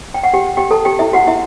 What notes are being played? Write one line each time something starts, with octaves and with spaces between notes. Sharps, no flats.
G5
F#5
G4 G5
G4 G5
A4 A5
G4 G5
E4 E5
F#4 F#5
E4 E5